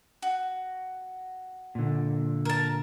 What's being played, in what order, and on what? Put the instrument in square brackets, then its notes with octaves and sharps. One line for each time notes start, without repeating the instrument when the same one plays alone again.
[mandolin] F#4
[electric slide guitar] A#2 D3
[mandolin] A#4 A5